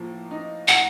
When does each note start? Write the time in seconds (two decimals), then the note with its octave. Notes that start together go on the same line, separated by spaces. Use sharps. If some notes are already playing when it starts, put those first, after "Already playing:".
Already playing: A2 F3 A#3
0.31 D#4
0.68 A2 F#5